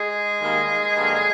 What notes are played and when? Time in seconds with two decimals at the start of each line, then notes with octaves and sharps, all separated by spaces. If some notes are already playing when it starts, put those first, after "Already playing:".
Already playing: G#3 G#4
0.41 D#2 D#3 G3 A#3
0.96 G2 D3 F#3 A#3